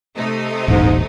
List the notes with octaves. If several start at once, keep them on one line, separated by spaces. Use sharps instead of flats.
C3 A3 D#4
D#1 A1 G#2